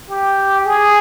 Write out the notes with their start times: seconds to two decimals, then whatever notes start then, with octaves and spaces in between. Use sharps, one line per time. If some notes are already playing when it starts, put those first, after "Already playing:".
0.09 G4
0.66 G#4